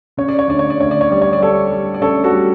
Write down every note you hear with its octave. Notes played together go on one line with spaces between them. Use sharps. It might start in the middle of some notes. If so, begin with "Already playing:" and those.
C#3 C#5
D5
C#5
D2 D5
C#5
D5
D2 C#5
D5
C#5
G3 D5
C#5
D5
G3 A4 C#5
G3
D5
C#3 A4 C#5
F#4 A4
G3